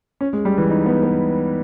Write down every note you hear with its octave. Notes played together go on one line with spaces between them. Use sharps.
C#4
G#3
G3
E3
D#4
B3
B3